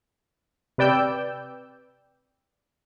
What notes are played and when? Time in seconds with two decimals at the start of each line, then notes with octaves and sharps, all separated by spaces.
0.78 C3 B4 D5 G5 E6 G6